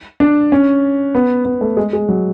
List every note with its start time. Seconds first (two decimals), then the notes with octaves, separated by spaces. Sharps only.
0.20 D4
0.52 C#4
1.15 B3
1.45 B3
1.61 A3
1.77 G#3
1.93 G#3
2.08 F#3